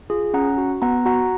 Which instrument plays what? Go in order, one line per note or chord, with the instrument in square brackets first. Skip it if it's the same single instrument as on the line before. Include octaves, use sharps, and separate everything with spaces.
[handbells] F4 G#4
C#4 F#5 A#5
F#4
B3 F#5 A#5
F#4 F#5 A#5